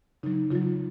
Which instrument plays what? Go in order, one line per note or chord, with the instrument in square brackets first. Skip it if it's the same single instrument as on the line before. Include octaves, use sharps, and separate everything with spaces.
[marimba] C#3 F#3 D#4
C#3 F#3 F4